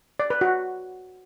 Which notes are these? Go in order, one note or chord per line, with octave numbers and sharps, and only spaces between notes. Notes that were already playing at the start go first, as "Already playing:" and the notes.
D5
B4
F#4